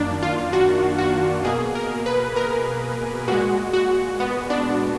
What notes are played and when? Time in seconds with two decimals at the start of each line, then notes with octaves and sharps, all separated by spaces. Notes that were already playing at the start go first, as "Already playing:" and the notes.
Already playing: F#2 D#3 A#3 D4
0.23 F4
0.53 F#4
0.98 F#4
1.44 B2 A#3 G#4
1.75 A#4
2.06 B4
2.36 A#4
3.28 A#2 G#3 F#4
3.73 F#4
4.20 B3
4.50 D4